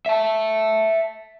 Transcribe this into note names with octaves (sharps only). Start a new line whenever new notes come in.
E5 A5